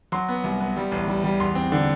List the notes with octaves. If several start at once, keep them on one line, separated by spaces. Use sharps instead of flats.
F#3 C6
B3
C2
B3
G3
A1
G3
G3
E2 C6
C4
D3